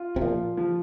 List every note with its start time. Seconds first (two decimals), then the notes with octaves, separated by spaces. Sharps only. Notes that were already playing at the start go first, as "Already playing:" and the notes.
Already playing: F4
0.16 C3
0.21 A#2 F3
0.57 F3